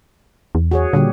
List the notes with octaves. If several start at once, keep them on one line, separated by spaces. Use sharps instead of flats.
E2
F#4 G#4 C#5
A#2 D3 G3 G4